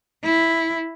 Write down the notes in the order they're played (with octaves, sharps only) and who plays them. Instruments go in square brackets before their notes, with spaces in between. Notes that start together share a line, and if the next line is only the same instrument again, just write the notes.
[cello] E4